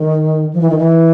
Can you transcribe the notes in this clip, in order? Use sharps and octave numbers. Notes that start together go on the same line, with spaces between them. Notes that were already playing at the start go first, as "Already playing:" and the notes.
Already playing: D#3
F3
E3
D#3
E3